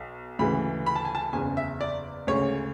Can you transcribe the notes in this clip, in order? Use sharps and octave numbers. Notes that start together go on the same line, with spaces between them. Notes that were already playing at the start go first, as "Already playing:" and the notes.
Already playing: B1
D2 C#3 E3 G#3 B5
B5
A5
G#5
A5
F#1 E2 C#3 G#5
E5
D5
D2 C#3 G#3 C#5